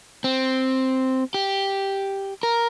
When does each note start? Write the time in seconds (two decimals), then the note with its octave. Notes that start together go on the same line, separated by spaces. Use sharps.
0.24 C4
1.34 G4
2.43 A#4